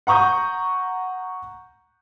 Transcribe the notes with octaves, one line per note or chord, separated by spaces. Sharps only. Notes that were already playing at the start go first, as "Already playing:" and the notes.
F#5 A#5 C#6 D#6 G6